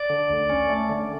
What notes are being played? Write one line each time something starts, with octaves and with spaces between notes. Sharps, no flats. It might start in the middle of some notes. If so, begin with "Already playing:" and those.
Already playing: D5
D3
D2
C#4
A3
D3